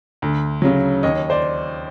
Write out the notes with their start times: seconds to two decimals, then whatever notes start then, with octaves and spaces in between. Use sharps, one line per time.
0.22 D2
0.62 C#3 F#3
1.03 D#2 C#5 D#5
1.30 C5 D5